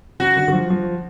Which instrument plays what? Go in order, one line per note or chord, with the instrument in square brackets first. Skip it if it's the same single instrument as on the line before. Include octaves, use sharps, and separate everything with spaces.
[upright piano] C#3 [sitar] F#4
[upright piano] D3
D3
F3
F3